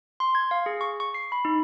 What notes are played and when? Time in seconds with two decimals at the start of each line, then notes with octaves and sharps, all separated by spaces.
0.20 C6
0.35 G#6
0.51 F5
0.66 G#4
0.81 C#6
1.00 C#6
1.14 C7
1.32 B5
1.45 D#4